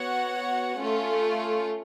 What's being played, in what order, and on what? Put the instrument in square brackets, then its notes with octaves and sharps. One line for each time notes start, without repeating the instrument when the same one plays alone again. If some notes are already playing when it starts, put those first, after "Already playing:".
Already playing: [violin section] B3 F#4 C#5 F#5
A3 C#4 F4